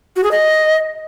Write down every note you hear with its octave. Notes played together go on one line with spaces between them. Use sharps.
F#4
G#4
D#5